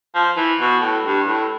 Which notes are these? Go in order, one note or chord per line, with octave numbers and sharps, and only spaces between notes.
F3
E3
B2
A2
G2
A2